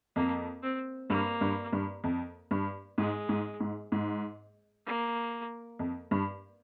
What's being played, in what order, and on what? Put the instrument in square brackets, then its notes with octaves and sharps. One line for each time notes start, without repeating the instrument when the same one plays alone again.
[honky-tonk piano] F2 [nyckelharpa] A#3
[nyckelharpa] C4
[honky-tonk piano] G2 [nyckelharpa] A#3
[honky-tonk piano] G2
G2
F2
G2
[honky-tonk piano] G#2 [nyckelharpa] G#3
[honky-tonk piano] G#2
G#2
G#2
[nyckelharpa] A#3
[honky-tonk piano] F2
G2